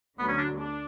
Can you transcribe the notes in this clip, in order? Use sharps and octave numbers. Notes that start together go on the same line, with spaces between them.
D2 D3 F#3 B3
C#4
D4
D4